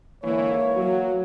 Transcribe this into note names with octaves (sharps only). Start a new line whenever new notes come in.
G#2 D3 E3 A#3 C#5
F#3 F#4